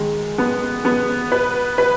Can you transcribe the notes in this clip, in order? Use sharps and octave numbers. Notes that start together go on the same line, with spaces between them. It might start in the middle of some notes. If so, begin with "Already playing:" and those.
Already playing: D#3 G#3
B3
B3
B4
B4